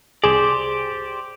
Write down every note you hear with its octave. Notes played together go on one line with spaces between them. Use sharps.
C2 G4 G#4 C5 D5